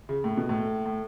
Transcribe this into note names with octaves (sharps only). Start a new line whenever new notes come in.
C#3
A2
B2
A2
A2